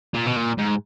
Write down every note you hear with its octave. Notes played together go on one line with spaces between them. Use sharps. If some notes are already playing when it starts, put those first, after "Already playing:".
A#2
B2
A#2
G#2